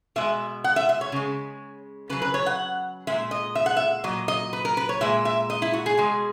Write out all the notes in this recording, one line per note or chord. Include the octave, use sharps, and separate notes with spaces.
B2 G#3 E5
F#5
E5
E5
C#5
C#3 G#3
C#3 F#3 B4
B4
C#5
F#5
A#2 G#3 E5
D#5
E5
F#5
E5
A#2 F#3 D#5
D#5
B4
A#4
B4
C#5
A#2 G#3 E5
E5
D#5
E4
F#4
G#4
B2 G#3